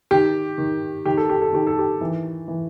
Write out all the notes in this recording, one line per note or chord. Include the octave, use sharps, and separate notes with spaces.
D#3 G4
D#3
D#3 G4
A4
G4
A4
D#3 G4
A4
G4
E3
E3